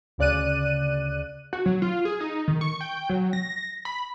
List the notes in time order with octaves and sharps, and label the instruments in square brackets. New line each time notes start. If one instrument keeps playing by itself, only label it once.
[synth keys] D2 C#3 D5 F#6 D#7
[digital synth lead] F#4
F#3
F4
G#4
D#4
D#3
C#6
G5
F#3
A#6
B5